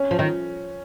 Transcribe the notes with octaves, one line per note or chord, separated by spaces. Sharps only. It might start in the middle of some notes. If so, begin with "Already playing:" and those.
Already playing: C#4
F3
D#3